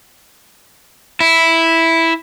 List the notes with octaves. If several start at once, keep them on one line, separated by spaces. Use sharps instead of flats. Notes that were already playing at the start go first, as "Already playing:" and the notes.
E4